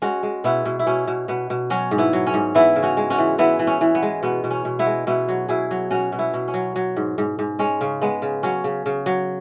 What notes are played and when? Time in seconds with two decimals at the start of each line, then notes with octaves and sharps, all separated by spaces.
0.02 G#3 C#4 F#4
0.23 G#3
0.44 B2 B3 E4
0.66 B2
0.79 E4
0.87 B2 C#4
1.07 B2
1.28 B2 B3
1.50 B2
1.70 F#3 C#4
1.91 G#2
1.98 B3 E4
2.13 F#3
2.27 C#4
2.34 G#2
2.55 E3 B3 E4
2.76 C#3
2.83 C#4 F#4
2.97 G#3
3.10 C#4 F#4
3.18 E3
3.38 E3 B3 E4
3.59 E3
3.67 C#4
3.81 E3
3.95 B3
4.03 G#3
4.23 B2 B3
4.44 B2
4.51 C#4
4.65 B2
4.79 B3 E4
4.86 G#3
5.07 B2 B3 E4
5.28 F#3
5.49 B2 E4 G#4
5.71 F#3
5.91 B2 C#4 F#4
6.12 B2
6.19 B3 E4
6.34 B2
6.48 C#4
6.54 F#3
6.76 F#3
6.97 G#2
7.18 G#2
7.39 G#2
7.59 G#3 C#4
7.81 C#3
8.01 G#3 B3
8.22 C#3
8.43 F#3 C#4
8.64 C#3
8.86 C#3
9.06 F#3